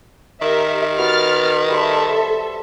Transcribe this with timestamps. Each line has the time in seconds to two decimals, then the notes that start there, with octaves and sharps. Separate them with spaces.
0.41 D#3 G4 A#4 E5
0.98 F#4 B4 C#5 F6 A6
1.69 G3 A4 C5 E5